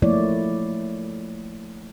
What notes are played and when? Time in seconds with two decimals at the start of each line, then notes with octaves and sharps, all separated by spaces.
0.02 F3 A3 A#3 E4 C#5 D5